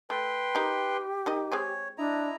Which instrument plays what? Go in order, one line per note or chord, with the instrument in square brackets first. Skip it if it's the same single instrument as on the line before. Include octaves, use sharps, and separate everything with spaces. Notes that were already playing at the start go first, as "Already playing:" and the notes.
[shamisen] A3 [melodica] B4 G5 C6
[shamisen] D#4 A#4 [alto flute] G4
[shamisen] D#3 D#4 D#5
[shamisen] G#3 C4 G#4 [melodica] C#5
[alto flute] D4 [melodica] E4 D#5 A#5